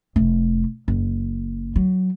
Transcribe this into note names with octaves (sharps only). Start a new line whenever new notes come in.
F1
F#1
F#3